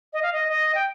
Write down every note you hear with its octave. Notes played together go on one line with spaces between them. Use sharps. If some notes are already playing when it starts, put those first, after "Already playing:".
D#5
F5
D#5
D#5
G5